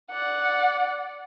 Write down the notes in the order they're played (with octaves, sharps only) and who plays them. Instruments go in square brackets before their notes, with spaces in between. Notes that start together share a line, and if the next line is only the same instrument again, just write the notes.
[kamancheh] D5 F#5